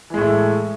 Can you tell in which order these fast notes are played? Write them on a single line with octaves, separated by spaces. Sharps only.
E3 G#3 A2 A3